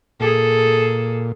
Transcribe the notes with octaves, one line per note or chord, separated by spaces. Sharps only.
A#2 G#4 A4